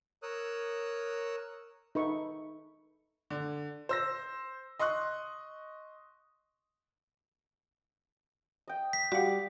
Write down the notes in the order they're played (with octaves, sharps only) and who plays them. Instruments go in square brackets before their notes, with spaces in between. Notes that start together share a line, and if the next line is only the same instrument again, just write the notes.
[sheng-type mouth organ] A#4 C#5 D#6 E6 F#6
[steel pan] D#4 A4 B4 E5 B5 C#6
[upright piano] D3
C5 E6 A#6
D#5 C6 C#6 D#6 F#6
[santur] D#5 G5
[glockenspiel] B6
[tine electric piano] G3 [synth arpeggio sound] F#4 F#5 [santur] G4 F5 D6